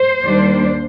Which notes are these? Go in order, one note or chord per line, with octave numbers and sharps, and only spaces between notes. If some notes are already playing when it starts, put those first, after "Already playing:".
Already playing: C5
D#2 D#3 G3 A#3 D4